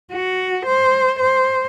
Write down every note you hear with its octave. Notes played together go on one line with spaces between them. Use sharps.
F#4
C5
C5